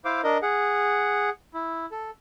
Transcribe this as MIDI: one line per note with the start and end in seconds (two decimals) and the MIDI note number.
0.05 0.21 64
0.05 0.21 72
0.05 0.21 77
0.05 0.21 86
0.24 0.38 62
0.24 0.38 70
0.24 0.38 75
0.42 1.30 68
0.42 1.30 78
1.54 1.86 64
1.91 2.10 69